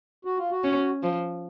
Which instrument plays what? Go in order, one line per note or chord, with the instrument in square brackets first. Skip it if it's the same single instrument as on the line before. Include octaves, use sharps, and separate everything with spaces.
[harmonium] F#4
F4
F#4
[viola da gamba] C#4
F3